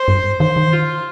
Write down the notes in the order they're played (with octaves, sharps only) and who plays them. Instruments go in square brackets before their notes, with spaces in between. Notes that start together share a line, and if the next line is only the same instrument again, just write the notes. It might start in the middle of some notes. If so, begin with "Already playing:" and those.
Already playing: [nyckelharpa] C5
[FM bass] G2
[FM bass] D#3 [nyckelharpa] C5
[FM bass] D#3
[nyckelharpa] F4